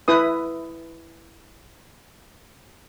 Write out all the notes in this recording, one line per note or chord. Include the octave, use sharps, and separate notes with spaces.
E4 B4 D#6